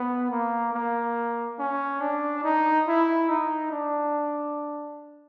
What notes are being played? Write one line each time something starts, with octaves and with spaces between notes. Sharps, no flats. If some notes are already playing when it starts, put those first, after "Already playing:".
Already playing: B3
A#3
A#3
C#4
D4
D#4
E4
D#4
D4